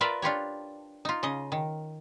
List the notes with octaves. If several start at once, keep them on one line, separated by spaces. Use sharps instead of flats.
F4 A#4 B4 D5 E5
D4 F4 G4 C#5
D#4 F4
C#3 D#5
D#3